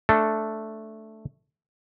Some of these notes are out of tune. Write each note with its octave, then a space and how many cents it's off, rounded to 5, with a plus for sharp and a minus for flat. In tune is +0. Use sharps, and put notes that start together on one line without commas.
A3 +0 D4 +0 A4 +0